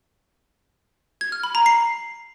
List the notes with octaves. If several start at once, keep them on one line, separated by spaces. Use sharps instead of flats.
G#6
F6
B5
A#5
C7